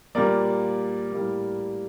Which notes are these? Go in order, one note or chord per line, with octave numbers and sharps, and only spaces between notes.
A#2 G3 A#3 A#4 D5
A2 G3 A#3